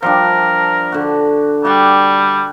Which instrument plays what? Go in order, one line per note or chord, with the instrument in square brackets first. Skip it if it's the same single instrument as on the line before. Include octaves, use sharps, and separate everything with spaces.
[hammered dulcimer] F3 G3 D4 [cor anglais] A#4
[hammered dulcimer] D3 F#4
[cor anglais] G3 [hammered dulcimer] F#4 G4 F#5